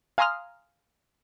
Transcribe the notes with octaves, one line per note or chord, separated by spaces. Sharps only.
F5 G#5 A#5 C6 D#6 F6